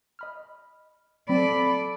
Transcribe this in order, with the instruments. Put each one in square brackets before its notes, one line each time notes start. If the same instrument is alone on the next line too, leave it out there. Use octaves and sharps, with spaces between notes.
[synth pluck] D#5 B5 F6
[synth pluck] F#3 C4 [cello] A4 D5 [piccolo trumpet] B5